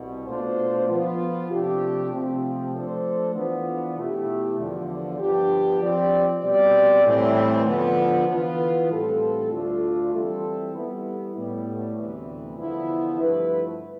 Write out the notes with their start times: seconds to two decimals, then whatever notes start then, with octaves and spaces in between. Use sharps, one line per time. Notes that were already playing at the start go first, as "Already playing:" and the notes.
Already playing: C2 B2
0.27 B2 A3 D4 F4 C5
0.88 F3 B3 F4
1.50 C3 F3 A3 D4 G4
2.11 C3 F3 A3 C4
2.73 F3 A3 D4 A4 C5
3.35 E3 B3 D4 F4
3.96 B2 A3 E4 G4
4.58 E2 D3 F3
5.19 G2 F3 B3 D4 G4
5.81 F3 C4 G4 D5
6.42 B2 G3 C4 G4 D5
7.04 A2 E3 G3 C4
7.65 D3 F3 B3
8.27 E3 B3 F4 B4
8.89 A2 G3 C4 F4 A4
9.50 D2 D3 A3 D4 F4
10.12 E3 G3 C4 E4 A4
10.74 G3 B3 E4
11.35 A2 G3 B3
11.97 D2 C3 E3 G3 B3
12.58 E2 D3 F3 B3 E4
13.19 G2 F3 A3 E4 B4